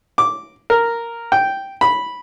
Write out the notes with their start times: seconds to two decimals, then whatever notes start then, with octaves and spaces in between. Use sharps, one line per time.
0.18 D6
0.70 A#4
1.32 G5
1.81 B5